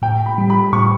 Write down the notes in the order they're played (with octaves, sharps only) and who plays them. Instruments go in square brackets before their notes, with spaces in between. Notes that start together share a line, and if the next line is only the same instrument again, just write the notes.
[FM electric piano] A2 [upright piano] G5
[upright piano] B5
[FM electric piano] G3
[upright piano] B5
[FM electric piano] A2 [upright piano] C#6